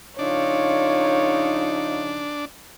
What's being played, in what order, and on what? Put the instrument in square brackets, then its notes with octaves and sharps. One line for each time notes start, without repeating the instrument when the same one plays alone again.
[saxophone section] C#3 F3 D#4 [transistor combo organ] D4 [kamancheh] F4 C#5